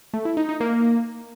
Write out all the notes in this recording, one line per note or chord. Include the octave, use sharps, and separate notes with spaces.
A3
E4
D#4
D#4
A#3